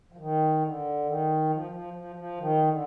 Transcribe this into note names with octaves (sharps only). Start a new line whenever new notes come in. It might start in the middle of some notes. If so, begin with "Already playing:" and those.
F3
D#3
D3
D#3
F3
F3
F3
F3
D#3
D3